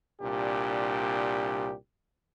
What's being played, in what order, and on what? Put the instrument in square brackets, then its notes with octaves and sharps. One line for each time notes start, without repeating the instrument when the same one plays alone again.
[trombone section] C2 A#2 D4 G4